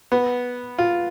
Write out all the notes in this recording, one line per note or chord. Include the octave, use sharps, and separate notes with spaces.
B3
F4